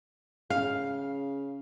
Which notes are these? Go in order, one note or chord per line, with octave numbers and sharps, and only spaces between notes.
C#3 F5